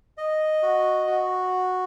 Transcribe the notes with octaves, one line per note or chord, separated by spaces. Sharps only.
D#5
F#4
F#4